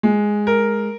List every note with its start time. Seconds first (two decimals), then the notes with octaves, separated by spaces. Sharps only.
0.03 G#3
0.47 A#4